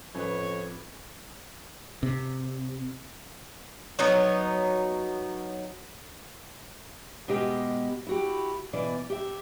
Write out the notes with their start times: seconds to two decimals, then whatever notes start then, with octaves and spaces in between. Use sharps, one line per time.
0.15 A1 F2 B4 C#5
2.03 C3
3.99 F#3 B3 D#4 C#5
7.28 B2 G#3 G4 D#5 G5
8.07 E4 F#4 G4
8.73 B2 E3 D5
9.10 G4 E5